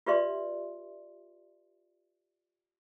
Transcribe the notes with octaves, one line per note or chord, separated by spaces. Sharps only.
F4 G4 B4 D5 E5 C6